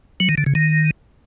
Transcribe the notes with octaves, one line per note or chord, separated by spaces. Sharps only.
F#3
D#3
D3
C#3
D#3